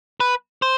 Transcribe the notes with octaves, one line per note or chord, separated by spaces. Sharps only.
B4
C5